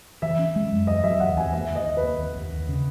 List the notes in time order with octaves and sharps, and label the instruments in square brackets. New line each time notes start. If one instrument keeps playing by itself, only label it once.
[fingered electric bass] E3 [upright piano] E5
[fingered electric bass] C#4
G#3
F#2
[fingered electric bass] E2 [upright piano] D#5
[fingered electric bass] F#3 [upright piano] E5
[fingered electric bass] E2 [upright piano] F#5
[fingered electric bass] E2 [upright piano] G#5
[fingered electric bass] A#3 [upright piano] E5
[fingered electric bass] D#3
[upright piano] D#5
[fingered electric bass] D#2
[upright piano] B4
[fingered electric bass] A#3
D#2
D#2
D#2
C#3